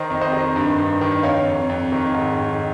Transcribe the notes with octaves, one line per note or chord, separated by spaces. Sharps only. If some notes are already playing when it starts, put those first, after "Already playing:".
Already playing: D#3 C5 D#5
F2
C5 D#5
D#3
G2
G2
D#3
F2 C#5 F5
F2
F2
D#3
G#2
D#3